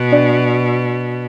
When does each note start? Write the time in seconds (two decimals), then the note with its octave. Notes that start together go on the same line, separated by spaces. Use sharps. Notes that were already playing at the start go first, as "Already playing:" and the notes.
Already playing: B2
0.12 D4 D5